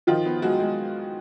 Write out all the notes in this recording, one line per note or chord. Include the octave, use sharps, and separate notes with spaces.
D#3 F3 F4
B3
F#3 G#3 F#4
G#3